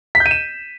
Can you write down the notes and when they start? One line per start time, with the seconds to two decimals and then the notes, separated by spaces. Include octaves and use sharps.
0.15 B6
0.20 G6
0.26 D#7
0.31 E7